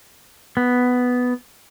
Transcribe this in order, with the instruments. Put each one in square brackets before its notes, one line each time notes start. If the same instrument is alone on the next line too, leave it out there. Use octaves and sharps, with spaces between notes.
[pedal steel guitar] B3